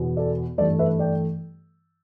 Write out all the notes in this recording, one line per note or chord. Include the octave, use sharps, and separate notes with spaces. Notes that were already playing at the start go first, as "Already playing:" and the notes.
Already playing: E2 B2 B3
A4 D5
G2 E3 A3 A4 D5
B4 E5
D5 G5